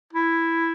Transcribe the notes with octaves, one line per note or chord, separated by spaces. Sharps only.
E4